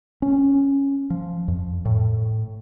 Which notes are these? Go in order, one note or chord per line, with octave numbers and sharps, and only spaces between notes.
C#4
F3
F2
A2